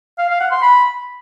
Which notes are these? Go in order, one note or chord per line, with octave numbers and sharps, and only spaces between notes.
F5
F5
F#5
C6
B5